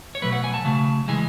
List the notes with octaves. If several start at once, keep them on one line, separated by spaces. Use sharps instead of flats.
C#5
B2 F#3 A3 B4
F#5
G#5
A5
C#3 F#3 A3
C#3 E3 G#3 G#5